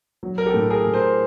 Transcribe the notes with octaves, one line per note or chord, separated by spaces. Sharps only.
F#3
A#4
G4 A4
A2
G#4 A#4
A2
A#4 C5